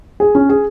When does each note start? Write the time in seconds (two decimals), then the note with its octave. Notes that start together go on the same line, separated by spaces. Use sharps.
0.20 G#4
0.35 C#4
0.49 G#4